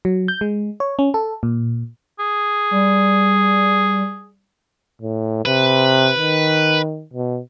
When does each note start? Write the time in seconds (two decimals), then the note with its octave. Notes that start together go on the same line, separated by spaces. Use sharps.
0.05 F#3
0.28 G6
0.41 G#3
0.80 C#5
0.99 C#4
1.14 A4
1.43 A#2
2.19 G#4
2.71 G3
5.02 A2
5.45 C3 B4
6.18 D#3
7.13 B2